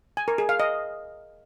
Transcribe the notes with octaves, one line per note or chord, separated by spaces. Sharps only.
G#5
A#4
G#4
F5
D#5